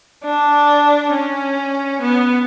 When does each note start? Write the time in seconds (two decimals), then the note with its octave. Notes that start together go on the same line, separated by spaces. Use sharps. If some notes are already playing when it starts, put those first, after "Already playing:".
0.25 D4
1.12 C#4
2.02 B3